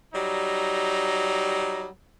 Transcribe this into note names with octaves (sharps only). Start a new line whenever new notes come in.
F#3 G3 D#4